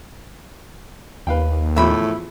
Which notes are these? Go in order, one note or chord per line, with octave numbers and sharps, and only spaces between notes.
D#2 B4 F5 G5
E2 A2 F3 E5 B5